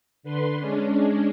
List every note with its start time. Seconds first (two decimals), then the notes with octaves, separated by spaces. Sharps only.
0.23 D3 B4 C6
0.57 G#3 C#4 D4